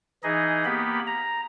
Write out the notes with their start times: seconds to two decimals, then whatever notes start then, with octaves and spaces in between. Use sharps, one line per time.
0.23 E3 D#4 G#4 D#5
0.65 A#3 B3 G4 B5
1.06 A#5